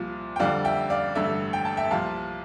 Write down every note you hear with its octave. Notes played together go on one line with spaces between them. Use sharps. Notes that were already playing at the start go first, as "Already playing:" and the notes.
Already playing: C2 A#2 F3
G5
F2 D3 G3 D5 F5
E5 G5
D5 F5
A1 G2 D3 A3 E5
G5
A5
E5 G5
C2 A#2 F3 F5 A5